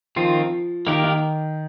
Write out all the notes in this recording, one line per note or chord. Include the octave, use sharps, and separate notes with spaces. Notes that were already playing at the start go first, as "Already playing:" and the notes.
D#3 F3 C4 F4
D#3 A#3 G4 A#4
D#3